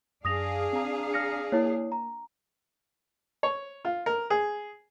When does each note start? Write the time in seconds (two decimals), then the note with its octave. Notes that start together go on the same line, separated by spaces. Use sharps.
0.25 F#2 D4 G#4 F5 D#6 A#6 F7
0.73 C4 A#5
1.13 F6 A#6 C#7
1.52 A#3 E4 C#5
1.92 A#5
3.43 C#5
3.85 F4
4.06 A#4
4.30 G#4